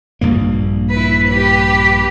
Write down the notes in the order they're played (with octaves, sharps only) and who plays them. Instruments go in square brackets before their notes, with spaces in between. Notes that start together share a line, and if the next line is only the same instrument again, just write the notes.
[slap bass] A#1 G2 A#3
[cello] E4 B4
G4 B4